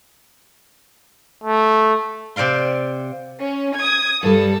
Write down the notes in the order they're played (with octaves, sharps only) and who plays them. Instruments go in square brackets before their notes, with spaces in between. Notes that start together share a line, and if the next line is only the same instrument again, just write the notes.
[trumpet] A3
[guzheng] C3 C5 D5 F5 C6
[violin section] C#4
D#6 G#6
[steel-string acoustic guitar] G2 G3 [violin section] A4